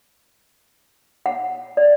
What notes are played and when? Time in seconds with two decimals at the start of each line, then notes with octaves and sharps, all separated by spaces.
1.26 F#5
1.77 D5